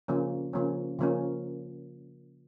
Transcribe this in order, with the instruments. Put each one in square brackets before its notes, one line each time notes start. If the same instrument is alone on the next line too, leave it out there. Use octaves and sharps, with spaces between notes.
[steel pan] C#3 F3 A#3 C#4
C#3 F3 A#3 C#4
C#3 F3 A#3 C#4